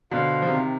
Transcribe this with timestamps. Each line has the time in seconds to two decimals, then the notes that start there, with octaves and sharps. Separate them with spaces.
0.11 B2 D3 F4 C5 F5
0.42 F3
0.48 C3 D#3